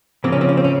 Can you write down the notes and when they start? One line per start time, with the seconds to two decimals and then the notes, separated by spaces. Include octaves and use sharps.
0.24 C#3 F3 A#3 C4
0.32 C#4
0.41 C4
0.49 C#4
0.57 C4
0.64 C#3 C#4